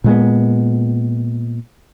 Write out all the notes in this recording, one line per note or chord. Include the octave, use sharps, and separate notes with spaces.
A#2 G#3 B3